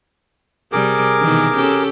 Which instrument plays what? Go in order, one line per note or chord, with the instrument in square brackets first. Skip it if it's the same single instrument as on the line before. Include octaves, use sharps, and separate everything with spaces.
[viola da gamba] C3 G3 [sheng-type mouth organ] G#4 A#4 D6
[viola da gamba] B2 D#3 E3
C#4 G4 A4